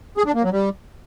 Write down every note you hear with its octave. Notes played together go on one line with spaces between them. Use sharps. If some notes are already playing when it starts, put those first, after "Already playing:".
G#4
D4
A#3
F#3
G3